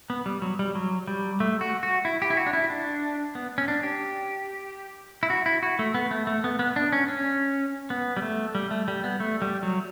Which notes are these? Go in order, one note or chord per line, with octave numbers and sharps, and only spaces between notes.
B3
G3
F#3
G3
F#3
G3
A3
F#4
F#4
E4
G4
E4
F#4
D4
E4
D4
B3
C#4
D4
G4
E4
F#4
E4
F#4
A3
B3
A3
A3
B3
B3
D4
C#4
C#4
B3
G3
A3
G3
A3
G3
B3
A3
G3
F#3